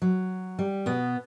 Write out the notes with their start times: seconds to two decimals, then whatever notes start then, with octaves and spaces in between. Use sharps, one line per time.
0.02 F#3
0.59 G3
0.86 B2 B3